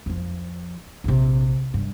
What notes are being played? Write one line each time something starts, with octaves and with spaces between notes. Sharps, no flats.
F2 F3
A#1 C3
G2